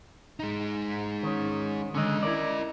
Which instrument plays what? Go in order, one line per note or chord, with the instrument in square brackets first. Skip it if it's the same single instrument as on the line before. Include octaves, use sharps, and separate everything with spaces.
[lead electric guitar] G#3 D#4
[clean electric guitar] D#3 C#4
[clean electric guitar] D3 D#3 G#3 [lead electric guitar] C#4 D#5
[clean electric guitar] E4 A#4 D5